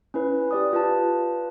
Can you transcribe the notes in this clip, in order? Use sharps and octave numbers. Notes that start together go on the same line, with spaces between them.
C#4 E4 B4
G4 D5 D#6
F4 B4 A5